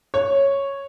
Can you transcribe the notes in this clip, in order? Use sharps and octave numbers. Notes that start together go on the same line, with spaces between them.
C#5